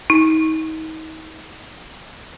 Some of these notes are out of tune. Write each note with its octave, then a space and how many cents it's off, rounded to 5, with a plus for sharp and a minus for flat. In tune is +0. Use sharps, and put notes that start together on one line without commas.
D#4 +35